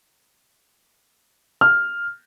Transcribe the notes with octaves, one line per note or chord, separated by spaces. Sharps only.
F6